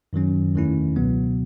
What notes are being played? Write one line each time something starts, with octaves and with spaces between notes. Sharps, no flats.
F#2 D#3 F#3 C#4
E2 D#3 A3 C#4 E4
C#2 B2 F#3 B3